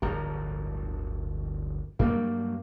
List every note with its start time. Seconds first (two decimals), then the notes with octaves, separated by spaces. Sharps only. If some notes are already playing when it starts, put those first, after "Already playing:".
0.02 D1 G1 F3 A#4
1.99 G2 F#3 G3 A#3